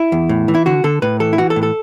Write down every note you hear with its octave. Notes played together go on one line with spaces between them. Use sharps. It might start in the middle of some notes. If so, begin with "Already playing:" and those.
Already playing: E4
E2
A2
E3
E4
D3 F#4
D3 A4
A2 B4
E3 A4
E4
E3 F#4
A4
A2
A4